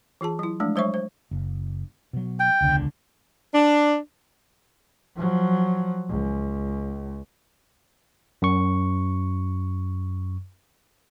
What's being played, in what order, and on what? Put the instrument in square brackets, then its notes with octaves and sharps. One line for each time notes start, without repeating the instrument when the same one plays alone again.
[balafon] E3 F4 G#4 A5
F#3 E4
F3 G#3 A3 D4
F#3 G#3 C5 C#5 E5 C#6
C5
[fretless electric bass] F#1
B2 F#3
[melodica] G5
[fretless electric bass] E1 C#2 D3
[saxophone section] D4
[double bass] F3 F#3
C#2
[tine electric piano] F#2 C#6